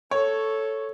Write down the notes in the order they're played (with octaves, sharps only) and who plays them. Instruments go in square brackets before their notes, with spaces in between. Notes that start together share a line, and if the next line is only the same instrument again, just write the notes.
[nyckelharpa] A4 [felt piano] C#5